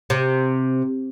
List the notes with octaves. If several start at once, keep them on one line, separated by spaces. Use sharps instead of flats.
C3